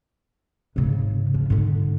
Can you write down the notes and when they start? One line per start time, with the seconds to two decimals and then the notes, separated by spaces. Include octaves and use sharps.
0.76 G#2 C#3
1.34 F3
1.50 G#2 D3